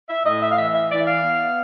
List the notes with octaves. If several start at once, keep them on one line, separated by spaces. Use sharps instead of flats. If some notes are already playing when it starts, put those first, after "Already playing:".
E5
A2 D#5
E5
F5
E3 E5
E5
E3 D5
F5
B3